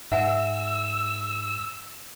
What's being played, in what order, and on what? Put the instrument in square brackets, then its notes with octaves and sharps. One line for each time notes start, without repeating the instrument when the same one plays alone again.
[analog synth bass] G#2 [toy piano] E5 F#5 G#5 [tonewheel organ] E6